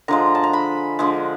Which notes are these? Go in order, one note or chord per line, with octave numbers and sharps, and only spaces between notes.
D3 F3 G#3 A#5
A5
A#5
B5
D3 F3 G#3